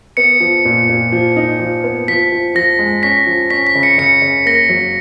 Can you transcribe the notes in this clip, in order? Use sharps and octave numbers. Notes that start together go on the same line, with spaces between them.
B3 C#7
F3
A#2
A#2
F3
D#4
F3
B3
F3 B6
F3
F3 A#6
G#3
C#4 B6
F3
C#4 B6
B6
C#3
C#7
C#3 C#7
C#3
A#3 A#6
F#3